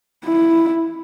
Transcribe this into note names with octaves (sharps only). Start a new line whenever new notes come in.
E4